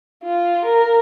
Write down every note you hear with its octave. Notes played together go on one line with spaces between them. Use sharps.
F4
A#4